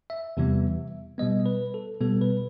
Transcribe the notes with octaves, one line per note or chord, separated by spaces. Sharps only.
E5
E2 C3 E3 G3 B3
B2 G3 B3 D#5
B4
A4
B2 G3 B3 A4
B4